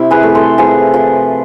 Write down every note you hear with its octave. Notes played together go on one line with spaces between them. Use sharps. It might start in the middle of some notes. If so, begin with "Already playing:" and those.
Already playing: C3 E4
G#4 B4
A3
A4 C5
F3 G#4 B4
F3